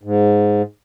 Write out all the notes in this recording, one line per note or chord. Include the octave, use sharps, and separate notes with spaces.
G#2